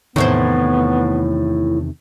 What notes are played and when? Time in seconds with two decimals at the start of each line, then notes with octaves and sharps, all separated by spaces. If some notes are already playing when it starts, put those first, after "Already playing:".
0.16 E2 A2 C3 D#3 B3 E4 C5